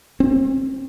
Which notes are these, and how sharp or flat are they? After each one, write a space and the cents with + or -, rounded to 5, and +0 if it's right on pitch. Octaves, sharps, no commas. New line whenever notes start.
C4 +35